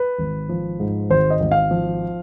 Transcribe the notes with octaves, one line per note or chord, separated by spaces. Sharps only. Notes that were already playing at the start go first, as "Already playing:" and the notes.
Already playing: B4
G#1
F3
G#2
G#1 C5
D#5
G#1
F5
F3